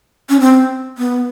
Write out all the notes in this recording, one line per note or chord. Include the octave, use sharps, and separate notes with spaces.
C#4
C4
B3